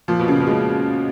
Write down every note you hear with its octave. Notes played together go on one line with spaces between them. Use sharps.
A#2 F3
B2
A#2 C#3
B2
A#2 G#3